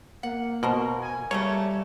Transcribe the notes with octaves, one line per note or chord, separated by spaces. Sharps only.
A#3 F#5
B2 F#4 A#4 C5
G#5
C#3 G3 A3 A#3 C#5